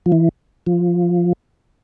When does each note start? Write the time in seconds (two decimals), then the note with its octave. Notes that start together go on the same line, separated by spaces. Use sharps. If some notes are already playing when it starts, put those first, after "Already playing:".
0.06 F3
0.12 E3
0.66 F3